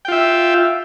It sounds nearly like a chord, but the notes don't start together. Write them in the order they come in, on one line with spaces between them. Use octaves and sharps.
G5 F4 E5